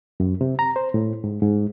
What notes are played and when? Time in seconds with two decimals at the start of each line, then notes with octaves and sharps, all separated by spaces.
0.20 F#2
0.41 C3
0.59 A#5
0.76 C5
0.94 A2
1.24 G#2
1.42 G#2